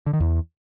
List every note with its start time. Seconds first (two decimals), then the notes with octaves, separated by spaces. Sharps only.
0.06 D3
0.13 D#3
0.20 E2